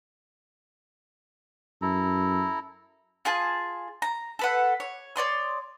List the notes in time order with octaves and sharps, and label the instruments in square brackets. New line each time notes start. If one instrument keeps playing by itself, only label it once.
[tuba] F#2 [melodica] E4 A4 A#5
[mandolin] F4 G#4 A5
A#5
A4 B4 F#5
C#5
C#5 D5 C6 D#6